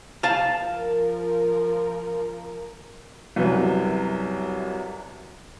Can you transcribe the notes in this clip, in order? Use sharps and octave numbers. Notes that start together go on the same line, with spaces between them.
F5 A5
F3 A#4
C2 F#2 C3 B4